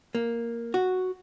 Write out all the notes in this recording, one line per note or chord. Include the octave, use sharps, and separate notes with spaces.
A#3
F#4